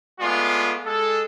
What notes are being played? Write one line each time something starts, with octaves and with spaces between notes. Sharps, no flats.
G#3 A3 B3 F4 D5
G#3 A4